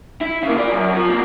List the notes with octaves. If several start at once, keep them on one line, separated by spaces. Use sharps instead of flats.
E4
C#3 A#3
F4 D5
F#2
F3
B2 A#3